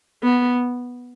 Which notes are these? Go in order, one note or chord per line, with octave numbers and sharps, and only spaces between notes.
B3